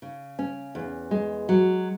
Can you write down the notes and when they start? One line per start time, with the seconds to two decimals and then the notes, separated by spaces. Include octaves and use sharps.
0.02 C#3
0.39 C#4
0.75 E2
1.11 G#3
1.49 F#3